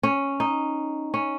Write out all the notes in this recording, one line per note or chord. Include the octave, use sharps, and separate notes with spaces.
C#4
D#4
C#4